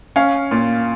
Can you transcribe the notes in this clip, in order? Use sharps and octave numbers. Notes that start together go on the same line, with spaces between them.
C#4 F5
A#2